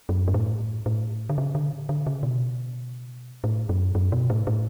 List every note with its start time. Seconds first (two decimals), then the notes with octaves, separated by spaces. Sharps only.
0.09 F#2
0.28 G2
0.34 A2
0.86 A2
1.29 D3
1.38 C#3
1.55 D3
1.89 D3
2.07 C#3
2.23 B2
3.44 A2
3.69 F#2
3.95 F#2
4.12 B2
4.30 A2
4.47 A2